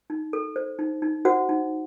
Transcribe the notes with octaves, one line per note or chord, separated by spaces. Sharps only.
D#4
A4
C5
D#4
D#4
F#4 C5 F#5
D#4